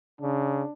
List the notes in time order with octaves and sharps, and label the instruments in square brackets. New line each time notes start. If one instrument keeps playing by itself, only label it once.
[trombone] C#3 [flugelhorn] D4